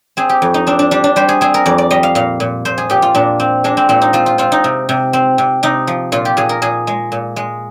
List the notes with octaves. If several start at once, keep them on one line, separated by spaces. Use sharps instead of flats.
C4 G#4
G4
F2
D#4
C4 D4
D4
G3 D4
D4
G3 C5
G#4
C4 G#4
A#4
F2 D5
D5
G3 D#5
F5
A#2 F5
A#2
A#2 C5
G#4
A#2 G4
F4
A#2 D4
C4
G#3 D4
C4
A#2 C4
D#4
C4 F4
F4
C4 F4
D#4
C3
C3
C4
C3
C3 D#4
F3
A#2 F4
G4
A#2 G#4
A#4
A#2 G#4
G#3
A#2
G#3